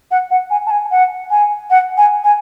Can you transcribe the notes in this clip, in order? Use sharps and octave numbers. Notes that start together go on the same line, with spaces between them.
F#5
F#5
G#5
A5
G#5
F#5
G#5
F#5
G#5
G#5